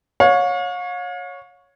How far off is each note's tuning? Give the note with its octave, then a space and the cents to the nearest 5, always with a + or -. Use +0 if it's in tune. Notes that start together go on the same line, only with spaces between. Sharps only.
C#5 +0 F5 +40